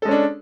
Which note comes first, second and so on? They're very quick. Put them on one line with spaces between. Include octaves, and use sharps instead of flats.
A4 G#3 C#4 D4